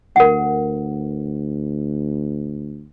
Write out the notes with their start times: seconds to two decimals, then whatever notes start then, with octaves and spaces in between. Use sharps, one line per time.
0.16 D2 A#4 F#5